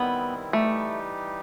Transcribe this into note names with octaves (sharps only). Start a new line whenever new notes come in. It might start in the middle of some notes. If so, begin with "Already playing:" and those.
Already playing: D#3 G3 B3 C4 E4
E3 G3 A3 D#4 G4